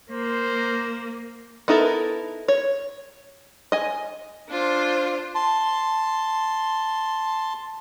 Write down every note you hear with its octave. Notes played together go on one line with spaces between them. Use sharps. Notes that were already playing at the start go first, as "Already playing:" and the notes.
A#3 C5
B3 D#4 E4 A4 A#4
C#5
D#5 G#5
D4 F4 C5
A5 C6